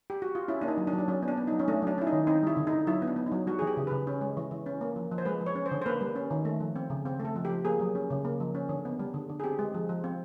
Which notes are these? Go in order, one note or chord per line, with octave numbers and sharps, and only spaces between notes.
G4
F#4
F4
C#4 E4
A#3 D4
D#4
F#3
D4
F#3
D4
F#3 C#4
B3
D4
B3
D#4
F#3
C#4
A3 D4
F#3 D4
C#4 E4
D#4
D#3
C4 D#4
G3 E4
D3
D#4
D3
F#3 E4
B3
D4
B3
D#4
F#3
G3 F#4
G#4
E3
G4
C#3
C#3 B4
C#4
G#3
E3
E3
C#4
A#3
F3
F3
C5
G#3 B4
F3
C#5
C#4
C5
D3
C5
A#3 B4
G3
C#4
D#3
A3
F3
C4
C#3
C4
A3
A4
F3
G4
F3
A#3 G#4
F#3
C#4
C#3
A#3
F3
C#4
D3
B3
G3
D3
D3
G#4
C4 G4
G#3
F3
F3
C4